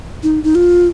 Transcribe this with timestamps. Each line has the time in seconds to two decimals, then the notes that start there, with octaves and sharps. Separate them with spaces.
0.23 D#4
0.44 D#4
0.55 F4